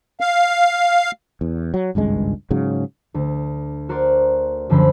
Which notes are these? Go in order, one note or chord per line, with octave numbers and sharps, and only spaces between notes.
F5
E2
F#3
G#1 C#2 G2 G#3
G#2 C#3 F#3
D2
F#4 A#4 C5 D5
F#2 D3 F3 C5 B5 A6